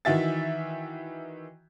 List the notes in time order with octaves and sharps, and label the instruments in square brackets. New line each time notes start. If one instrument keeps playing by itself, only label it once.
[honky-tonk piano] D#3 E3 F#4 E5 A6